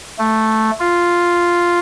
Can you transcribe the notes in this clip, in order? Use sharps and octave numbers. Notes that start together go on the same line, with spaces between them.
A3
F4